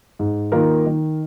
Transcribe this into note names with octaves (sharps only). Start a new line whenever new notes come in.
G#2
D#3 A#3 F4 A#4
D#3